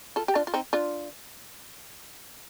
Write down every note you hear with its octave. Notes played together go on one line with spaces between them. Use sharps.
F4 A4
G4
D4 F4
F4
C4 D#4
D4 F4